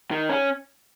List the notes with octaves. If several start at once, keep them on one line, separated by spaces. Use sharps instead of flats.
D#3
C#4